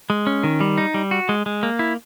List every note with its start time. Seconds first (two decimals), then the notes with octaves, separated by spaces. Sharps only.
0.10 G#3
0.27 C#4
0.44 D#3
0.61 G3
0.78 D#4
0.94 G3
1.11 F#4
1.29 G#3
1.46 G#3
1.63 A#3
1.79 E4